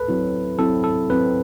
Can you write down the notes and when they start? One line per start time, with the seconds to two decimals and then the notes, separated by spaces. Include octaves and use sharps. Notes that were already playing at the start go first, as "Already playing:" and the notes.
Already playing: A4 B4
0.08 F#3 C4 E4
0.58 F#3 C4 E4 A4
0.84 A4
1.10 F#3 C4 E4 B4